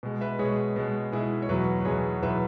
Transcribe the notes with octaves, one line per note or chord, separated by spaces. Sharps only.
B2 G#3
B4 E5
B2 G#3 G#4 C#5
B2 G#3
B2 G#3 E4 G#4
C#5
E2 B2 F#3 F#4 B4
B4
E2 B2 F#3 G#4 C#5
E2 B2 F#3 B4 E5